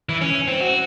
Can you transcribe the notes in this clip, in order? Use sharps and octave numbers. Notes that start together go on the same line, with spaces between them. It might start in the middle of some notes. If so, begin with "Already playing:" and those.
E3
C#4
C4
F#4